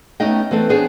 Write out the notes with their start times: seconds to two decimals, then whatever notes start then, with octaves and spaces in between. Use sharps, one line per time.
0.20 A3 B3 C#4 D#4 D#5 G5
0.51 E3 A3 B3 C4 A4
0.69 B3 C4 D4 G#4 C5 C#5